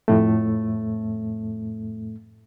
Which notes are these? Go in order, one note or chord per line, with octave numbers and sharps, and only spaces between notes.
F2 A2 A3